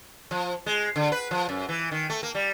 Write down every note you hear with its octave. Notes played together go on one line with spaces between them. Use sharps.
F3
G#3
D3
B4
F3
F#2
E3
D#3
A3
A#3
G3